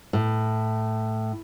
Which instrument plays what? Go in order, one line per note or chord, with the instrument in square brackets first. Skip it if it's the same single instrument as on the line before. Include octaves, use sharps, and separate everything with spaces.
[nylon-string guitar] A2